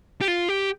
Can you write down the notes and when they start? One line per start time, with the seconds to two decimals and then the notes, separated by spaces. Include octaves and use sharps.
0.21 G4
0.28 F4
0.49 G4